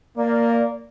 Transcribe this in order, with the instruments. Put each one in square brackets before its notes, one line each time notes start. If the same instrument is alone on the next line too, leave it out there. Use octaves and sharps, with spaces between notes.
[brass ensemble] A#3 [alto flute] D5